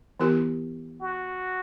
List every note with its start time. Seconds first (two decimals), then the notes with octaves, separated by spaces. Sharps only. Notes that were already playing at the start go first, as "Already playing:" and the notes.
0.20 E3 B3 E4 G4 A#4
1.01 F#4